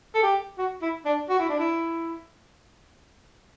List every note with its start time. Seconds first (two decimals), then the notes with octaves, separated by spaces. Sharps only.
0.15 A4
0.23 G4
0.58 F#4
0.82 E4
1.05 D4
1.29 F#4
1.39 E4
1.49 D4
1.59 E4